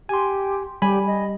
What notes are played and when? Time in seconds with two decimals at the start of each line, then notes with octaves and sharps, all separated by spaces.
0.09 G4 G#5 C6
0.82 G3 G4 G#5 B5
1.07 D#5